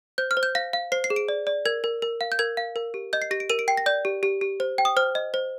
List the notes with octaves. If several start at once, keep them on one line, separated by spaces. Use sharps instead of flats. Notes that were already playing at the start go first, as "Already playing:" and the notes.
C5 G6
F6
C5
G6
F5 A#6
F5
C5 C7
C7
G#4
D7
D5
D5
A#4 G#6
A#4
A#4
F5
G6
A#4 G#6
F5
A#4
G4
D#5 G6
C7
G4 A#6
D7
A#4 D#7
D7
G5 C7
A#6
D5 G6
G4
G4
G4
C5
G5
D#6
C5 F6
D#5
C5